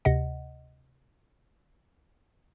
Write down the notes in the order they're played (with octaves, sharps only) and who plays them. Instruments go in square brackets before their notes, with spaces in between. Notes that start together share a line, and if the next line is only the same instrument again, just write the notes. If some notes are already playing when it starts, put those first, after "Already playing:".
[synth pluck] D2 C3 D#5 F#5